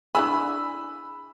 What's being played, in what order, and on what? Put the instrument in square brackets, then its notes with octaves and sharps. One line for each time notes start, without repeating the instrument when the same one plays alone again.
[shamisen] D4 E4 G#4 [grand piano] B5 E6